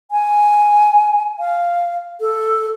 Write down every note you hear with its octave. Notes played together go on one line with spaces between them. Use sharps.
G#5
F5
A4